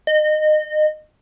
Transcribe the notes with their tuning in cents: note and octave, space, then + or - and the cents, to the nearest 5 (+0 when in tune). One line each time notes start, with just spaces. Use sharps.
D#5 -25